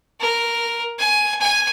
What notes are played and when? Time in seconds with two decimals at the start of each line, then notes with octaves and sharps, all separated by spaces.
0.20 A#4
0.99 G#5
1.41 G#5